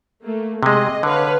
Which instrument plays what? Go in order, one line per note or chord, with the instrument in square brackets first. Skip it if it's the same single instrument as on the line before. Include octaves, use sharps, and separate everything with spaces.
[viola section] A3 A#3
[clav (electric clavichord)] C3 G#3 [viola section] G#4 D#5
[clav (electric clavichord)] D3 [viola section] B4 C#5 F5